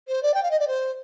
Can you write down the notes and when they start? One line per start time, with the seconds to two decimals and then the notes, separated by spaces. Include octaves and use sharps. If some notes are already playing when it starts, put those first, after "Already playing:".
0.08 C5
0.23 D5
0.34 G5
0.43 F5
0.51 D#5
0.59 D5
0.68 C5